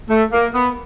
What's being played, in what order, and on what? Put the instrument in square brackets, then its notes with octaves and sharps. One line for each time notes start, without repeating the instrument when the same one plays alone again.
[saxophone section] A3
A#3
B3